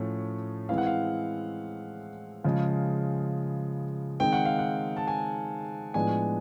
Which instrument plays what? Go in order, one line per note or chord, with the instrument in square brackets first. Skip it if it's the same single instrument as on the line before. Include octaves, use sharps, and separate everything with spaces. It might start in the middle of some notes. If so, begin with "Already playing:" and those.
Already playing: [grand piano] A2 F3 A3 C#4
E3 G#3 C4 E4 F5
F#5
F5
C#3 F3 G#3
D#3 G#3 C4 G5
F#5
F5
F#5
A5
G#5
A2 F3 G#3 B3 D4 G#5